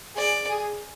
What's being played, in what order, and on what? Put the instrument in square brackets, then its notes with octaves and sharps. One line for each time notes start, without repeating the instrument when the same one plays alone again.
[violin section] G#4 [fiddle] D5
[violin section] G#4